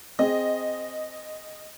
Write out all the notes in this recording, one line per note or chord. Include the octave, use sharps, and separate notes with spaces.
C4 G#4 D#5